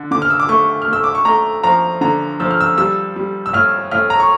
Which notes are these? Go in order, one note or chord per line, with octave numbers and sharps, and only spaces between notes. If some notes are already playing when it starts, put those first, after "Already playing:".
Already playing: D3
D3 D6
F6
E6
D6
A3 C#6
F6
A3 E6
D6
C#6
A3 A#5
F3 A#5
D3 A#5
F3 E6
F6
E6
G3 E6
G3
E6
A2 F6
A2 F6
A#5
C#6